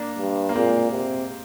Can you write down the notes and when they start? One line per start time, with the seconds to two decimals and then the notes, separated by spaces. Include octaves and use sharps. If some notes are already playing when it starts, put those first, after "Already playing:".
Already playing: A#3 D4
0.18 G2
0.49 A#3
0.55 A#2 G#3 C4
0.91 C3